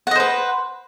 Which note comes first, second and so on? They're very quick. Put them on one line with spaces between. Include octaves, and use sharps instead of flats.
F#5 D#5 C5 B4